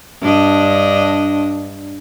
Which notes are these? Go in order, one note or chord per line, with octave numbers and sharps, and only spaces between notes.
G2 D4 D#5